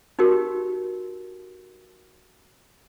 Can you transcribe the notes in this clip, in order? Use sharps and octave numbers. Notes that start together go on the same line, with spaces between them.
D#4 F#4 G4 A#4